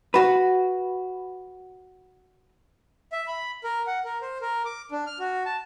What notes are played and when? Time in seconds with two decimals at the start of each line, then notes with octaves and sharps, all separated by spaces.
0.14 F#4 B4
3.12 E5
3.27 B5
3.64 A#4
3.87 F#5
4.05 A#4
4.22 C5
4.41 A#4
4.65 D6
4.91 D4
5.07 F6
5.19 F#4
5.46 A5